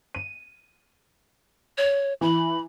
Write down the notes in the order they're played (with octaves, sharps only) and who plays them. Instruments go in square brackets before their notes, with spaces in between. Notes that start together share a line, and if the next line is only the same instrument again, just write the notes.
[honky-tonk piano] D#7
[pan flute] C#5
[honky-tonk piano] E3 [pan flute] B5